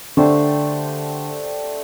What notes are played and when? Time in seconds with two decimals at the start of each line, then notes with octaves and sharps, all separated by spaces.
0.17 D3 A3 D4 G4 C5